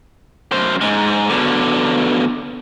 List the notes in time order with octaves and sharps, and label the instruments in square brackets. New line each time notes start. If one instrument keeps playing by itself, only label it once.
[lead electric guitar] F#2 C5
G#2 G#3
B2 D3